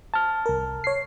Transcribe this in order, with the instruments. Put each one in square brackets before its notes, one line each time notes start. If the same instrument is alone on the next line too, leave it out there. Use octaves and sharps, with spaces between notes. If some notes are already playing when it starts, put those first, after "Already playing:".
[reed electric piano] A5 F6
[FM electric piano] C2 A#4
C#5 C7